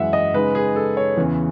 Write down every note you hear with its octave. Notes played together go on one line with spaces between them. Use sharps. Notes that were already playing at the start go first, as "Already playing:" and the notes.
Already playing: F#2 E3 G#3 E5 F#5
D#5
C#3 G#3 D#4 B4
G#4
A4
C#5
E2 C#3 E3